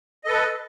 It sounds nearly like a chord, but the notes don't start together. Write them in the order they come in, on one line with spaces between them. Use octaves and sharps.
D#5 A4 B4